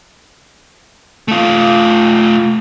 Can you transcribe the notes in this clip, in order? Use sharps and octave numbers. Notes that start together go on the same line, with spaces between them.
A3 F4